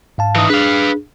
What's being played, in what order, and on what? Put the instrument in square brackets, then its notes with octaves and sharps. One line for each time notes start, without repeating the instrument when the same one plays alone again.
[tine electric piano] G#2 F5 A5
[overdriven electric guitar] E3 D#4
[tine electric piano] D4 G#4 [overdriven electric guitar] B4 F5